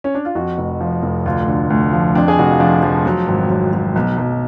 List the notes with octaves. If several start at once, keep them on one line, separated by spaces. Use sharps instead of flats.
C#4
D4
F4
F2 F#4
F1
F3
F1
D2 F4
D3
D2
F3
F2 D4
G#4
F1 F#4
F4
F3 D4
F3
F#3
G#1
F#3
F#3
B1
B1